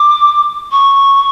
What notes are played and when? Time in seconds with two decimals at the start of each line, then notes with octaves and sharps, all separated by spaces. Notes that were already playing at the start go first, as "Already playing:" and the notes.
Already playing: D6
0.71 C#6